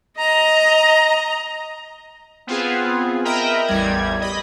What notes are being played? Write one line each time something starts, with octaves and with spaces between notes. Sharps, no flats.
D#5 A#5
B3 C4 F4 G#4
A#4 D#5 E5 G5 A#5 B5
A1 E2 G3 G#6
D#5 B5